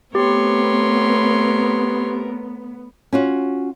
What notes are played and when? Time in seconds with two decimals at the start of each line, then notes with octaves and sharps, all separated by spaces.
0.15 A3 B3 C4 G4 A#4 C#5 C6
3.13 C#4 F4 F#4